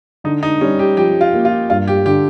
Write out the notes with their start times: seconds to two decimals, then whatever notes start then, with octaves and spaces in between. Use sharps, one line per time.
0.24 D3 D#4
0.43 D#4
0.61 G3 C#4
0.79 G4
0.97 F3 G4
1.21 F4
1.33 A#3
1.45 F4
1.70 G2 F4
1.88 G4
2.06 D3 G4